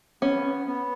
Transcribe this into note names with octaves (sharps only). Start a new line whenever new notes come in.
B3 C#4
B3